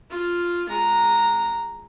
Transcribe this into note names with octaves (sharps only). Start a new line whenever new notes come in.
F4
G#3 A#5